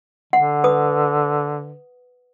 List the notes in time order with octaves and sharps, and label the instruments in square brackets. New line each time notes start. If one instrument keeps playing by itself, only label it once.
[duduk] D3 [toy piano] F#5
[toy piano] B4 D#6